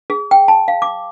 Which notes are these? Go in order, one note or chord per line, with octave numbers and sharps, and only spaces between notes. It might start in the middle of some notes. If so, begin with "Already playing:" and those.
G#4
G5
A5
F5
D6